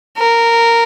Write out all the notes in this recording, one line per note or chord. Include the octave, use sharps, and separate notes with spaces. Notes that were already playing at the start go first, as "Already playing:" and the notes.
A#4